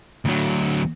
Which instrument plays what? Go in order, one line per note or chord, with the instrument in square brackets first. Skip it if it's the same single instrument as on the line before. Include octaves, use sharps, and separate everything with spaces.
[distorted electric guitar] D2 F#3